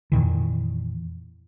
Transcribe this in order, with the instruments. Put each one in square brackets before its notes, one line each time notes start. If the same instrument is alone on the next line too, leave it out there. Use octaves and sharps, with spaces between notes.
[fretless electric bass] F2 A#2 D#3 E3